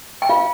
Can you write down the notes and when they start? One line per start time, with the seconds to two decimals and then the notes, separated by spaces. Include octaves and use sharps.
0.22 G5
0.29 F4 F5